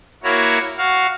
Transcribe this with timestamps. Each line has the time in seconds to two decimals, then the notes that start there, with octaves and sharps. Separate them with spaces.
0.23 A#3 E4 F#4 C#5
0.78 F#4 F5